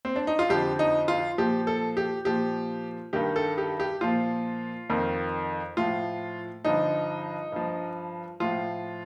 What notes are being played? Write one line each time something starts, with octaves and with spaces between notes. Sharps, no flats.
C4
D4
D#4
F4
F2 D3 F3 G4
D#4
F4
A#2 F3 G4
A4
G4
A#2 F3 G4
G2 D#3 G4
A4
G4
G4
A#2 F3 F4
F2 D#3
A2 F3 F4
G2 D3 F3 D#4
G2 F3
A2 F3 F4